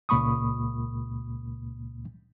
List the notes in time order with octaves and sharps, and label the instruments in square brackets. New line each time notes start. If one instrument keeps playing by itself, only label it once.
[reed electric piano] C#2 A#2 A#3 B5 C#6 D#6